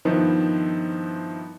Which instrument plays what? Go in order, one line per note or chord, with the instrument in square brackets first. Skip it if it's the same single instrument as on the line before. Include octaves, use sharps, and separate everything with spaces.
[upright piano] G2 D#3 F3 B3 D#4 E4